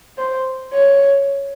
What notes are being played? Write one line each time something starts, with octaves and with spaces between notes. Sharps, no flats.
C5
C#5